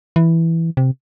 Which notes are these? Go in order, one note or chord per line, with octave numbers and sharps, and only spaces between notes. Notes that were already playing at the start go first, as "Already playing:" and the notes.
E3
C3